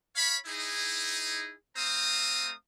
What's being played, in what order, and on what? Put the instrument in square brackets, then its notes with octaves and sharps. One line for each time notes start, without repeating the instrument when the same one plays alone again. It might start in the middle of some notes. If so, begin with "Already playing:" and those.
[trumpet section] C#5 F5 B5
D#4 E4 G#4
A3 C4 C5 F5 A#5 D#6